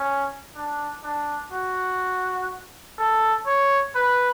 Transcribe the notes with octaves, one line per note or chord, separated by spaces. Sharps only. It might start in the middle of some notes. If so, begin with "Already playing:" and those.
Already playing: C#4
D4
D4
F#4
A4
C#5
B4